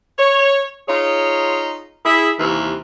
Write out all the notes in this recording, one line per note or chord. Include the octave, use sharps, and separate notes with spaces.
C#5
D#4 F4 G#4 C#5
E4 G#4
D#2 C3 E3